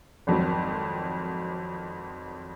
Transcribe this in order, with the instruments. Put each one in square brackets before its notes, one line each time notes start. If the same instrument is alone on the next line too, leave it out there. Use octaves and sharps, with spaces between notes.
[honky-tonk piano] G#1 F2 F#3 C4